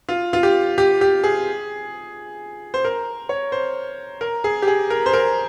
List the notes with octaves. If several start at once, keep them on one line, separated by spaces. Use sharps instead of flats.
F4
F4
G4
G4
G4
G#4
C5
A#4
C#5
C5
A#4
G#4
G4
G#4
A#4
C5
A#4